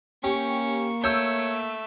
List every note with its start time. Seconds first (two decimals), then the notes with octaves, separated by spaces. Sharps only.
0.24 A#3 C#4 G4 C#6
1.04 A3 C#5 E6 G6